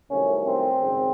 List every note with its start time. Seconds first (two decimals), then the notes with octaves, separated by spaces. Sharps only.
0.11 C2 C3 D#3 F#3 A3 C#4
0.47 C4
0.81 G#1 F#2 C#3